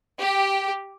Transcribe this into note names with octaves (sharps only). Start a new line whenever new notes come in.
G4